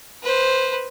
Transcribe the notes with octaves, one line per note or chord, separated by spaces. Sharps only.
B4 C5